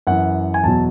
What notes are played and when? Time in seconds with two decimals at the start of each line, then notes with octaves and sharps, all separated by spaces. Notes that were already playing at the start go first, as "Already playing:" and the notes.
0.07 F#2 E3 F#5
0.54 G#5
0.64 E2 B2 F#3 A5